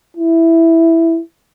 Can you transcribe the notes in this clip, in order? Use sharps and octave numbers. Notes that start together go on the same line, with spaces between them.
E4